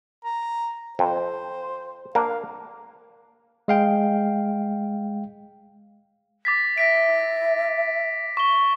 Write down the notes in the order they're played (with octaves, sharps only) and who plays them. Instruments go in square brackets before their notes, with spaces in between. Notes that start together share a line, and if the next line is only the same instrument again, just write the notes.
[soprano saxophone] A#5
[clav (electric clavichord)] F2 [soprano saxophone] C5
[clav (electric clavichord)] A#3 D4 [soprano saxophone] F5
[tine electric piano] G#3 F5 G5
[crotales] D6 A6 B6
[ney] E5 [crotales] A#6 B6 D7
[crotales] C#6 G7